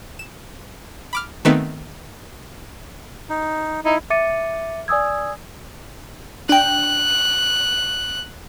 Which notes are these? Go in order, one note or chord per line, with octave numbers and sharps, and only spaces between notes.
E7
B5 D6 F6
D#3 A3 B3 C4 D#4 B4
D#4
D#4 E4
E5 D6 A6 C#7 D#7
D5 G#5 D#6 E6 G#6
D4 G5 F#6